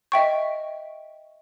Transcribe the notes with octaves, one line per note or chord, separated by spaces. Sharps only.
D#5 E5 G5 C#6